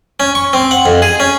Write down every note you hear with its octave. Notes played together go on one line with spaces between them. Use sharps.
C#4
C#6
C4
F#5
F2
G#4
C#4